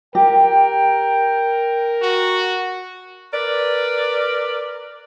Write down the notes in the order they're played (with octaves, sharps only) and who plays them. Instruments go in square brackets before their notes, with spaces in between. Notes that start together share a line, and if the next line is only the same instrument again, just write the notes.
[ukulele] G4 [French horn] A#4 [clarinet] G5
[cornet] F#4
[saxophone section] A#4 B4 D5